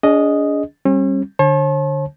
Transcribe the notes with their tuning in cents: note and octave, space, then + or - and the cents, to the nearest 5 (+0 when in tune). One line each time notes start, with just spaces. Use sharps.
D4 -35 G#4 +0 D#5 +0
G3 +0 C#4 -40
D3 +0 C#5 -45 A5 -35